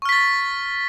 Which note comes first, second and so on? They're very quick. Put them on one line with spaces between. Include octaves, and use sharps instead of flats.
C#6 F6 B6 A6